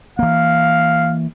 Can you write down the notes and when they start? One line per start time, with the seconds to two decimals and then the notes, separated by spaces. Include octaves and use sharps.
0.19 E3 A#3 F5